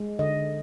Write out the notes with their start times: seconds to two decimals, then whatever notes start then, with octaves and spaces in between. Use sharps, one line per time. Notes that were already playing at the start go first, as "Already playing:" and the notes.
Already playing: G#3
0.19 D3 D#5